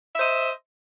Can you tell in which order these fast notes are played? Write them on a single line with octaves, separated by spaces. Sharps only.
E5 C5 D#5